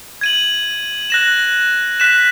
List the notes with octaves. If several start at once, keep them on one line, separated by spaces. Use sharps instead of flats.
G#6 D#7 F#7
F#6 A#6 E7
F#6 B6 E7